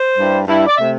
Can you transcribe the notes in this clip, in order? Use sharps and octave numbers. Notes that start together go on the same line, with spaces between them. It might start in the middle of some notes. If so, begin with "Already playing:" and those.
Already playing: C5
G2 G3 E4
G2 G3 E4
E5
D5
C3 A3 E5